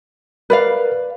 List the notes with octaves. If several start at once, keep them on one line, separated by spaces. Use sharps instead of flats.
A#4 B4 D5 F5